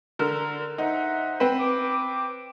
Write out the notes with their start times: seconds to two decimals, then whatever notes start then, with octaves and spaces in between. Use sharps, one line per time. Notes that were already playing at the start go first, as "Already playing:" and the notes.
0.19 D3 A#4 F6
0.78 D#4 C5 E5 F#5
1.40 C4 B4
1.60 D6